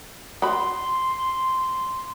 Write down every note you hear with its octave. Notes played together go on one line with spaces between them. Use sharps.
F#4 B5 C6